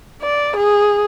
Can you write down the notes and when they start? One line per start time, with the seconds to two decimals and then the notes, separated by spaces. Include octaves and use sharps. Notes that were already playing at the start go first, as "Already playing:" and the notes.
0.23 D5
0.57 G#4